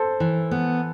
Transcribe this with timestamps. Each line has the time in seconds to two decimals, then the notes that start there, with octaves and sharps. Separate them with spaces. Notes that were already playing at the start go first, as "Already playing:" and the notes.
Already playing: A4 C5
0.20 E3
0.51 B3